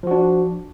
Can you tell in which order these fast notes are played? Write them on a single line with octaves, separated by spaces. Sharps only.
F3 F#4 D4